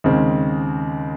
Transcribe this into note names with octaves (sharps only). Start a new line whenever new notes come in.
D#2 C#3 G#3 C4